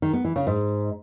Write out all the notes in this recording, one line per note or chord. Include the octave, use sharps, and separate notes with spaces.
D#3
B3
E3
C#3
G#2